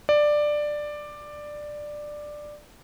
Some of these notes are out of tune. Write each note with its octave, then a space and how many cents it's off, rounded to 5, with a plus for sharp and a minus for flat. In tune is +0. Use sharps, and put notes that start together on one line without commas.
D5 +10